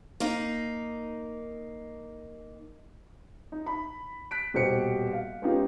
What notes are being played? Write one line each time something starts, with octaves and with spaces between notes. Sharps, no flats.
A#3 D#4
D#4
B5
F#6 B6 D7
D#1 B2 G4 C5 C#7
F5
G#3 B3 C#4 D#4 F4 G4